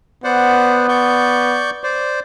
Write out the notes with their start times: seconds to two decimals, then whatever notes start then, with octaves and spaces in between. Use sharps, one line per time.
0.24 B3 C5 D5 F#5
0.89 D5 C#6 G6
1.84 C5 D5